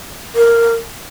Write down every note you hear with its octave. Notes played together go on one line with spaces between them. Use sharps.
A#4